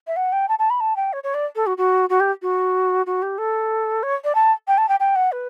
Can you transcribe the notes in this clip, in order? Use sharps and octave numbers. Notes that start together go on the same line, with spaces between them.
E5
F#5
G5
A5
A5
B5
A5
G5
C#5
C#5
D5
A4
F#4
F#4
F#4
G4
F#4
F#4
G4
A4
C#5
D5
A5
G5
A5
G5
G5
F#5
B4